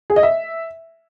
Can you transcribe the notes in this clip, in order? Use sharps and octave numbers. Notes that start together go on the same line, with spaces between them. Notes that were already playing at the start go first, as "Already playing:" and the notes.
G#4
D#5
E5